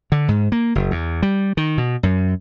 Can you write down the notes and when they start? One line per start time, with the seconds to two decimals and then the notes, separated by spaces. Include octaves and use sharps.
0.12 D3
0.28 G#2
0.52 A#3
0.75 F#1
0.91 E2
1.22 G3
1.57 D#3
1.78 B2
2.03 F#2